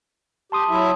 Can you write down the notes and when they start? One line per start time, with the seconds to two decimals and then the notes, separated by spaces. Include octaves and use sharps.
0.52 G4 A5 C6 D#6
0.70 F#3 E4 E5